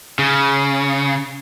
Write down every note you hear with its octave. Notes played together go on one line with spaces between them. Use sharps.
C#3